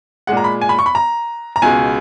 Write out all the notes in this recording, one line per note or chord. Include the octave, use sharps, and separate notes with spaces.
A#2 G#3 F#5
A#5
B5
G#5
B5
C#6
B5
A#5
A#5
C#2 B2 G#3 G#5